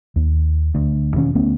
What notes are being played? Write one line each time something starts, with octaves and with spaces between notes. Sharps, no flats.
D#2
D2
E1 D#3 C#4
D2 A3 B3 C#4